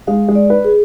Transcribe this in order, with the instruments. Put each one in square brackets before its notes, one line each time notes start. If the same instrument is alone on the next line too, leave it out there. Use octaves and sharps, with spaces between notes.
[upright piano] G#3 [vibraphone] F5
[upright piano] G#3
[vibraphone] D5
[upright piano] B4
[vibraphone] G#4